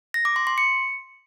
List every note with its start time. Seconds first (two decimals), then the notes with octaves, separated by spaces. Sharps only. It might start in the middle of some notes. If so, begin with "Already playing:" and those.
0.14 A#6
0.25 D6
0.36 C6
0.47 C6
0.58 C#7